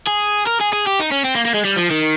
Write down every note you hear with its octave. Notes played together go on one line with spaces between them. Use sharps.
G#4
A#4
G#4
G#4
G4
D#4
C#4
C4
A#3
A#3
G#3
G3
F3
D#3